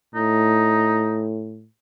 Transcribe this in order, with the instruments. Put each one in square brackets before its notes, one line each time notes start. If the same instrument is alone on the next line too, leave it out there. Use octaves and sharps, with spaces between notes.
[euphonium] A2 [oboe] D#4